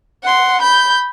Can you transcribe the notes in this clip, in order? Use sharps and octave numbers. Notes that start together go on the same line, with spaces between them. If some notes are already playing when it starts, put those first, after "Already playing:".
F#5 C6
B5 G6